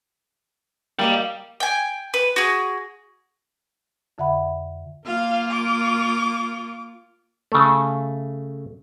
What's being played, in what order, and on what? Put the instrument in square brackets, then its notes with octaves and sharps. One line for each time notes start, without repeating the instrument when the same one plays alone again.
[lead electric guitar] G3 [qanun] A#3 A#4 D#5
[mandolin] G5 G#5
B4
F#4 G#4
[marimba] F2 D3 E5 F#5 B5
[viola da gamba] A#3 F4 [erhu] F5
[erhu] D6
[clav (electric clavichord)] C#3 A3